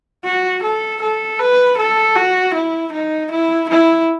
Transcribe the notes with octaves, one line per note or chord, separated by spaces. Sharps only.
F#4
A4
A4
B4
A4
F#4
E4
D#4
E4
E4